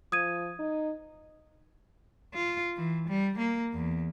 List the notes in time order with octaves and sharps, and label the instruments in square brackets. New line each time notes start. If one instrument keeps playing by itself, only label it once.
[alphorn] F3 [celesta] D#6 G#6 D#7
[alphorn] D#4
[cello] F4
E3
G3
A#3
E2